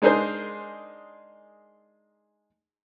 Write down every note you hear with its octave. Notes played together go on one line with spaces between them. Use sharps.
G#3 D4 D#4 G#4 A#4 C5